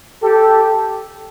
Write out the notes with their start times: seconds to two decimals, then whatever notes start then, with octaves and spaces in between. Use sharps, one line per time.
0.23 G4 A4